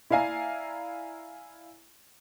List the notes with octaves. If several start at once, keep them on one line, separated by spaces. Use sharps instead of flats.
E4 D5 F5 G#5 A#5